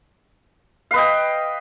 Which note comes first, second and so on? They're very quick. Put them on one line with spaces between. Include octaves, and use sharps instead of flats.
F5 B4 D#5 G5